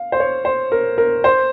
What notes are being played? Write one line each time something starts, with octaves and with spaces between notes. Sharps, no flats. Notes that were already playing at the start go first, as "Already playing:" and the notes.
Already playing: F5
C5
C#5
C5
A#4
A#4
C5